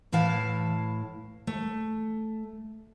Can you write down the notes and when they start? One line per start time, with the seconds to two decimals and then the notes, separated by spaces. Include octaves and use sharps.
0.12 A2 E3 E4 F5 A5
1.47 A3